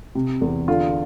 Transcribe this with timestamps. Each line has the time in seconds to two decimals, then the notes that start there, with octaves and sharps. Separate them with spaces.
0.15 C3
0.41 E2
0.68 D3 F4